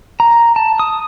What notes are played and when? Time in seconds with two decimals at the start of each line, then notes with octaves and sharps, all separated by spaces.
0.20 A#5
0.56 A5
0.79 D#6